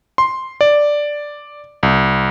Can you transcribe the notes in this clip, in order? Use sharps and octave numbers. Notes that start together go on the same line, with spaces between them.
C6
D5
C2